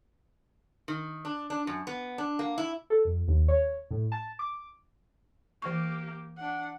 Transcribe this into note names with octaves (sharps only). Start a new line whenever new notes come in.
D#3
D4
D4
F#2
B3
D4
A#3
E4
A4
F2
D#2
C#5
A2
A5
D6
E3 A#3 G4 C#6
D4 F#5